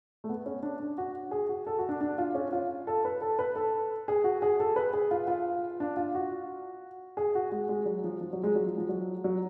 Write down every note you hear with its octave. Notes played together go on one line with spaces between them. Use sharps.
A3
B3
C#4
D4
D4
F#4
G#4
F#4
A4
F#4
D4
D4
F4
C#4
F4
A4
B4
A4
B4
A4
G#4
F#4
G#4
A4
B4
G#4
F4
F4
D4
F4
F#4
G#4
F#4
G#3
G#3
F#3
F3
F3
F#3
G#3
F#3
F3
F3
F#3
F#3